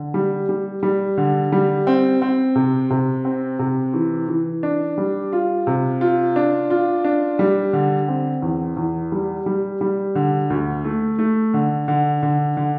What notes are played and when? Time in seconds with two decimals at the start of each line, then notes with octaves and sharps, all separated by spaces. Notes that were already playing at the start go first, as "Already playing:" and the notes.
Already playing: D3
0.14 G3
0.49 G3
0.83 G3
1.18 D3
1.52 G3
1.87 C4
2.22 C4
2.56 C3
2.90 C3
3.25 C4
3.59 C3
3.94 E3
4.28 E3
4.63 D4
4.98 G3
5.33 F4
5.67 C3
6.01 F4
6.36 D4
6.70 F4
7.04 D4
7.39 G3
7.73 D3
8.08 C4
8.42 E2
8.77 E2
9.12 G3
9.46 G3
9.81 G3
10.15 D3
10.50 D2
10.84 A3
11.19 A3
11.54 D3
11.88 D3
12.23 D3
12.57 D3